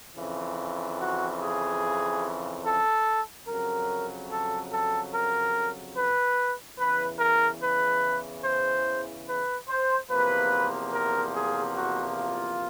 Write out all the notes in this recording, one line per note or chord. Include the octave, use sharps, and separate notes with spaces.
F2 C#3 E3
F#4
G#4
A4
F2 C#3 F#3 A#4
A4
A4
A#4
B4
E2 C#3 E3 B4
A#4
B4
C5
B4
C5
E2 C3 F3 A#3 B4
A#4
G#4
F#4
F4